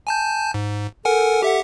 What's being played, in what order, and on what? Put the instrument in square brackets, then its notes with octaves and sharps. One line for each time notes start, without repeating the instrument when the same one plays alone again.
[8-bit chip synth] G#5 A5 G6
G#2
[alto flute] A4 [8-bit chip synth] A#4 F#5 G#5
[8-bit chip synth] G4 E5 F#5